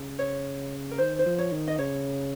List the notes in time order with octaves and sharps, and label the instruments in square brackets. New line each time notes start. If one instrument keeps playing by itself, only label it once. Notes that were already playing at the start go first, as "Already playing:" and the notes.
Already playing: [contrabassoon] C#3
[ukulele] C#5
A#4
[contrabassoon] D#3 [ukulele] C5
[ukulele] C5
[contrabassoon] F3
[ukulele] C#5
[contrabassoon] D#3
[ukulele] D#5
[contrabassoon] C#3 [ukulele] C#5